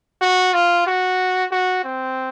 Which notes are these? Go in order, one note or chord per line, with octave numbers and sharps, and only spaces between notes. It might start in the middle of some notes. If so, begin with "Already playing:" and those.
F#4
F4
F#4
F#4
C4